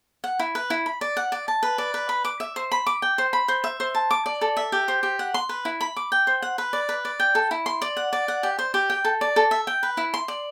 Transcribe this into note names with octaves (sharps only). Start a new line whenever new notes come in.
F#5
E4
B4
E4
B5
D5
F#5
D5
A5
B4
D5
B4
B5
D6
E5
C5
B5
D6
G5
C5
B5
C5
E5
C5
A5
D6
D5
A4
E5
G4
C5
G4
F#5
C6
B4
E4
B5
D6
G5
C5
F#5
B4
D5
B4
D5
G5
A4
E4
C6
D5
F#5
D5
F#5
G4
C5
G4
G5
A4
D5
A4
E5
G5
B4
E4
C6
D5